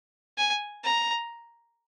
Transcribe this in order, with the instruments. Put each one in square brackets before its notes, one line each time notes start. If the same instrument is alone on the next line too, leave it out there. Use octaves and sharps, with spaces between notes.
[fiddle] G#5
A#5